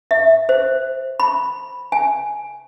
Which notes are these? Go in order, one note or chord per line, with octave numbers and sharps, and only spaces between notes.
E5
C5
B5
G#5